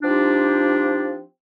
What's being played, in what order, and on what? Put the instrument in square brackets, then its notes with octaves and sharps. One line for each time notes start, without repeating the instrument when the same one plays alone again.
[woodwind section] F3 C4 D4 D#4 F4 G4